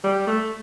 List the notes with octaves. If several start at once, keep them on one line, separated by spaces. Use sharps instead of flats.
G3
A3